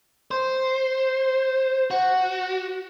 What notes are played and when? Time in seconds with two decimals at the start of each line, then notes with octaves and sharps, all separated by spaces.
0.31 C5
1.91 F#4